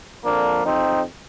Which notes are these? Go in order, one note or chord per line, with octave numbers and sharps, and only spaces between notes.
F2 D3 F3 A#3 D4
F2 C4 D#4